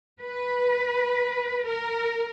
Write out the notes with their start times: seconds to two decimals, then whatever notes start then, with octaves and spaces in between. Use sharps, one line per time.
0.21 B4
1.67 A#4